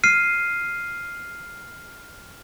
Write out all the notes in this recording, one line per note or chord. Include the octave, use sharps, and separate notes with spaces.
F6 C7 D#7